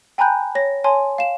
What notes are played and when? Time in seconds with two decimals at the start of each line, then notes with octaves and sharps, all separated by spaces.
0.18 G5 G#5 A#5 B5 F#6 G6
0.55 C#5 A#6
0.84 C#5 G#5 A5 C6
1.18 F5 E7